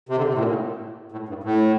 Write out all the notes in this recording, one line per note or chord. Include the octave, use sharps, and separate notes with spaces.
C3
D3
C3
A2
A#2
A2
A2
G2
A2